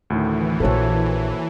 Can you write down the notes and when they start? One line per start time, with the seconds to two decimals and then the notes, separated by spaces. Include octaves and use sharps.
0.10 D2 A2 D#3 E3
0.60 A#1 A#2 A#3 F#4 A4 C5 C#5